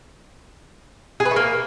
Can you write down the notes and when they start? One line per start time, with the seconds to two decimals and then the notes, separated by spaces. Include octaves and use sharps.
1.20 G#4
1.25 B4
1.31 A3
1.36 A#3